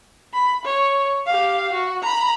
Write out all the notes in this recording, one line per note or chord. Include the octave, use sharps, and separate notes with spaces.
B5
C#5
G4 F5
F#4
A#5 B5